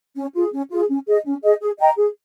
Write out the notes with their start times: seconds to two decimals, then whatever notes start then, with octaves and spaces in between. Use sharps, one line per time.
0.16 C#4
0.34 F4 G#4
0.52 C#4
0.71 F4 G#4
0.88 C#4
1.07 G#4 D#5
1.25 C#4
1.43 G#4 D#5
1.61 G#4
1.79 D#5 G5 A#5
1.97 G#4